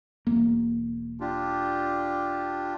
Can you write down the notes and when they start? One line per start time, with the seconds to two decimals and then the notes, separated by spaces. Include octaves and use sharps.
0.26 E1 A#3
1.20 D4 F4 G4